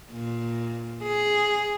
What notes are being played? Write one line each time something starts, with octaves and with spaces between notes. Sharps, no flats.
A#2
G#4